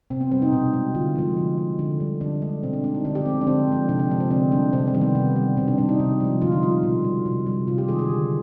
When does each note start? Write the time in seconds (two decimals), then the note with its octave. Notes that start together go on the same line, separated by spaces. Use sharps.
0.10 C3 C4
0.21 B3
0.31 G3 C4
0.42 D#4
0.53 B2
0.73 G#3
0.95 D3 F4
1.15 F3 G#3
1.37 D3
1.57 G#3
1.79 D3
2.00 G3
2.21 D3 D4
2.42 G#3
2.63 B2 C4
2.73 D4
2.84 G#3 D4
2.94 D#4
3.05 D3 D4
3.15 G4
3.26 F3 G#3 C4
3.41 D4
3.47 D3 C4
3.68 F3 G#3
3.89 C3 D4
3.99 D4
4.10 F3 G#3
4.20 C4
4.31 D3 C4
4.52 G3 D4
4.73 C3 C4
4.87 C4
4.94 D#3 G3
5.01 B3
5.15 C3 B3
5.36 G3
5.57 B2 C4
5.68 D4
5.78 G3 D4
5.89 D#4
5.99 C3
6.20 F3 G#3
6.42 D3 F4
6.52 D#4
6.63 G3 F4
6.83 B2
7.05 G3
7.26 C3
7.46 G3
7.67 C3 F4
7.78 G4
7.88 D#3 G#3 G#4
7.99 G#4
8.10 D3